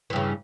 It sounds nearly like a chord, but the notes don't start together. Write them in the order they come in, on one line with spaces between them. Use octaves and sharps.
E3 G2 C#3